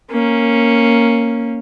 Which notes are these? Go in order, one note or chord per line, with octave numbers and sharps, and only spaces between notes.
A#3 C#4